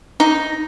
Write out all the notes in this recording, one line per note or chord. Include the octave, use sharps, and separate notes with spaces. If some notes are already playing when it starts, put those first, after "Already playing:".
D#4